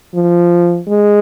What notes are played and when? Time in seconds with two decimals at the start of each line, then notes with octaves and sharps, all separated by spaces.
0.15 F3
0.88 G#3